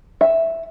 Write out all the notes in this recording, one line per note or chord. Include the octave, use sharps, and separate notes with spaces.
E5